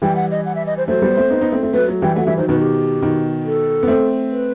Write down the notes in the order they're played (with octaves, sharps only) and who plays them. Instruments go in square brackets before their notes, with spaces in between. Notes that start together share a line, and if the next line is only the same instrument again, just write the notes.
[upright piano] E3 G3 [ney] G5
[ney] F#5
D#5
F#5
E5
D#5
C5
[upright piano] F#3 A3 [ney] C5
[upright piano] G3 B3
A3 C4
B3 D#4
B3 D#4
A3 C4
A3 C4
[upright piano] F#3 A3 [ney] B4
[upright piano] F#3 A3
[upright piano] E3 G3 [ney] G5
[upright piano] F#3 A3 [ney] F#5
[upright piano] E3 G3 [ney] E5
[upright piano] D#3 F#3 [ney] C5
[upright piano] B2 D#3 [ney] B4
[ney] G4
[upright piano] B2 D#3
[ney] A4
[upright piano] B3
A3 C4
[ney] B4